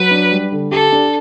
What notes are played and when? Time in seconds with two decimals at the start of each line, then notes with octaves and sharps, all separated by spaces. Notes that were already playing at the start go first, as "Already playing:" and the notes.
Already playing: F#3 B4
0.11 D4
0.32 G3
0.52 D3
0.71 G4 A4
0.92 D4